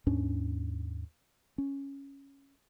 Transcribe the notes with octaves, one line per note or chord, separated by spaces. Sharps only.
D#2 G#2 C#4 D4
C#4